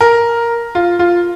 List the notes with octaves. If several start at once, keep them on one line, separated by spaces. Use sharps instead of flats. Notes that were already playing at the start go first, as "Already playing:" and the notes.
A#4
F4
F4